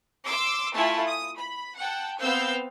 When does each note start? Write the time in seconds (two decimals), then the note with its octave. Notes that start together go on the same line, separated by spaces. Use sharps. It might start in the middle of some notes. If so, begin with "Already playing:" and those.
0.25 C6 D6 E6
0.75 A3 E4 F4 G#5 A5
1.06 D#6
1.37 B5
1.77 F#5 G5 A5
2.19 B3 C4 F5 E6 G6